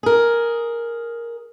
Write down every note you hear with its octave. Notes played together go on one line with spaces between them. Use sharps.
G#4 A#4